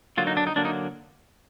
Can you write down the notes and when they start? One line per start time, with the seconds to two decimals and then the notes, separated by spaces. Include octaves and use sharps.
0.17 D3 F#3 A#3 F4
0.27 D#4
0.37 D4
0.47 D#4
0.56 D3 F#3 A#3 D4
0.65 D#4